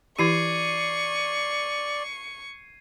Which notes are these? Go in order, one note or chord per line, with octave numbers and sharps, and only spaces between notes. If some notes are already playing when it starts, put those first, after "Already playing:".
E3 E4 G4 D5 C#6 G#6 C7 D#7